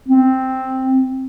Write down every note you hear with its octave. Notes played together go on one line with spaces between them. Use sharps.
C4